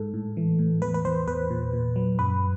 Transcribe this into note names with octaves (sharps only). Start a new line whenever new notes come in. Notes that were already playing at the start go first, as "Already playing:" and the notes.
Already playing: G#2 A4
A2
E3
A2
E2 B4
B4
E2 C5
E2 B4
A#2
A#2
F#3
F#2 B4